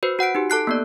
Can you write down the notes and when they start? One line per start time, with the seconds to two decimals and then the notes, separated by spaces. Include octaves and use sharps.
0.03 F#4 B4 C5
0.19 F#4 F#5 F#6 D7
0.35 D#4 G4
0.50 A4 A5 F#6 C7
0.67 A#3 B3 D5